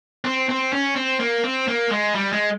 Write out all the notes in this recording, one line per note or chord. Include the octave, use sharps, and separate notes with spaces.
C4
C4
C#4
C4
A#3
C4
A#3
G#3
G3
G#3